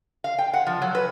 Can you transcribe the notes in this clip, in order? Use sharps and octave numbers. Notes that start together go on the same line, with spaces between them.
F5
G5
F#5
F3
F#3
B4